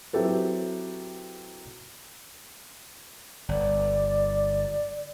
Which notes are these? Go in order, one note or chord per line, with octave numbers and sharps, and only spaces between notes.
F#3 C4 E4 G4 A4 B4
G1 D5